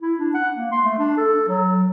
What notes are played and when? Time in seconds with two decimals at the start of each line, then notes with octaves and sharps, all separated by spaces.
0.01 E4
0.19 D4
0.34 F#5
0.56 A#3
0.72 C6
0.85 A3
0.99 D4
1.17 A4
1.48 F#3